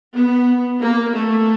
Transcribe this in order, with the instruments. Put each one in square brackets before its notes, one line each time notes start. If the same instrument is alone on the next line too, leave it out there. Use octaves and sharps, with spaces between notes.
[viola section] B3
A#3
A3